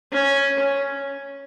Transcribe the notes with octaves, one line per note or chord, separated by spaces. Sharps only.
C#4